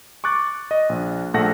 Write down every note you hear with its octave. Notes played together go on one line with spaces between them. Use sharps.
C#6 D6 F#6 A6
D#5
A#1
A#1 A3 A4 F#5 A#6